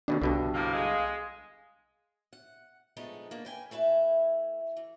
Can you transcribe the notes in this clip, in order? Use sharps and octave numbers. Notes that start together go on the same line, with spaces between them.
D#2 B2 D3 D4
C2 G2 B2 D3
A2 C3 A#3 F5
G#3
F#5
D3 F3 G#3 A3 B3 D#4
A#3 B3 D4
B4 G5 G#5
A3 E4 B4 E5 G#5
E3